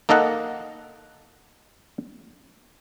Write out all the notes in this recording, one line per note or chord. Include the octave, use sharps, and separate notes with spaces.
A#3 D#4 A4 D#5 F#5